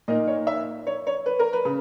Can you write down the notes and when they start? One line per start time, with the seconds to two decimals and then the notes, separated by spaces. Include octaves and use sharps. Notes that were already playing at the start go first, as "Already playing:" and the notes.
0.08 A#2 A#3 D#4 D#5
0.27 C#5
0.47 E5
0.87 C#5
1.07 C#5
1.26 B4
1.39 A#4
1.53 B4
1.65 C#3